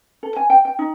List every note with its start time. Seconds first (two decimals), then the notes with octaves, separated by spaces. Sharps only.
0.23 A4
0.36 G#5
0.50 G5
0.65 G5
0.79 D#4